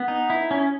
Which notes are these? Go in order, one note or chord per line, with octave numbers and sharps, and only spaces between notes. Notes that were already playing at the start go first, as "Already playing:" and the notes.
Already playing: B3
D#4
E4
C#4